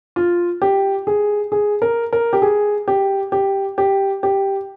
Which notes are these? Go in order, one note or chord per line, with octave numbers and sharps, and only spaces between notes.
F4
G4
G#4
G#4
A#4
A#4
G4
G#4
G4
G4
G4
G4